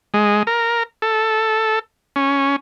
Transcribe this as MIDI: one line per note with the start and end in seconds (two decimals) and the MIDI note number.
0.14 0.43 56
0.47 0.83 70
1.02 1.79 69
2.16 2.56 61